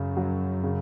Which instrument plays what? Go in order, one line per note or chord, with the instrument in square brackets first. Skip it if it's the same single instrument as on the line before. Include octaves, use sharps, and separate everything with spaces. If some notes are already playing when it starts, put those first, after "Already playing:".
Already playing: [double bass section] F#2 [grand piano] C#3
[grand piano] F#3
C#3